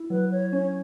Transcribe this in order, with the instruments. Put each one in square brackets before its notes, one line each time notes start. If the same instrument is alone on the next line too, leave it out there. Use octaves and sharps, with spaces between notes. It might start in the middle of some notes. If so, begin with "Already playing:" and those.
Already playing: [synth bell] E4
[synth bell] F#3 [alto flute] B4
[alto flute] C#5
[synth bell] C#4 [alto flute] C#5